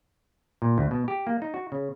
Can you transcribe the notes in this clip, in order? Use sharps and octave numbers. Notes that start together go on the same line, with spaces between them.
A#2
D2
B2
G4
A#3
D#4
F#4
C#3